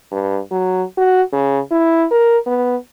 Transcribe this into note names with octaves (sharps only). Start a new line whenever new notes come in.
G2
F#3
F#4
C#3
E4
A#4
B3